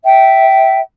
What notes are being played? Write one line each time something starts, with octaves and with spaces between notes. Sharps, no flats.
E5 G5